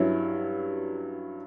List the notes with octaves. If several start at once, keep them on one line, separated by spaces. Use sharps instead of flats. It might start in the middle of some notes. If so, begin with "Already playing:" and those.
Already playing: G2 F#3 C#4 E4